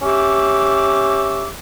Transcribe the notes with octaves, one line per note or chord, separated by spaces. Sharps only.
C#4 G4 E5 D6